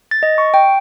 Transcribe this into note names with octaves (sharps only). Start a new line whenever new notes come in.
A6
D#5
C#6
G5